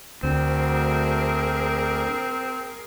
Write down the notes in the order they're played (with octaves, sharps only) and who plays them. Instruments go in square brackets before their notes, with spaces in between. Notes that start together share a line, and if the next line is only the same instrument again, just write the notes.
[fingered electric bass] D2 [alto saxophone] C4 [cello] G#4 A#4